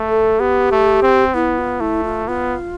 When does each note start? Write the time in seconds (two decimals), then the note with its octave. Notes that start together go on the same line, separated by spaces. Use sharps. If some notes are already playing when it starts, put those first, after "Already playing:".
Already playing: A3
0.09 A4
0.40 B3 G4
0.71 A3
1.02 C4
1.34 B3 E4
1.58 F4
1.80 A3 E4
2.04 F4
2.27 B3 F4